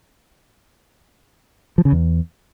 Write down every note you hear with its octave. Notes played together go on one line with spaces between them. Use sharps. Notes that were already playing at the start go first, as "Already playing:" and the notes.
F3
C#3
E2